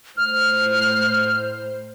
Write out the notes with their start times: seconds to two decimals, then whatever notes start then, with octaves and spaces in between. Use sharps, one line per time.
0.17 A2 C5 F6